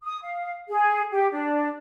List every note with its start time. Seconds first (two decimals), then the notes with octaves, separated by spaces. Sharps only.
0.03 D#6
0.22 F5
0.69 G#4
1.11 G4
1.31 D4